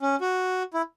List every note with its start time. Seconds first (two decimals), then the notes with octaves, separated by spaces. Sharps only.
0.02 C#4
0.21 F#4
0.74 E4